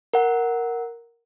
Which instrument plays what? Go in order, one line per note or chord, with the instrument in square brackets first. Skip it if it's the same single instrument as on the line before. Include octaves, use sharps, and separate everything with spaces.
[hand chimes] A#4 F#5